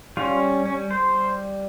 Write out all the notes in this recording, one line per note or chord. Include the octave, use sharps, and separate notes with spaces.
G3 C#4 F4
C#4
C5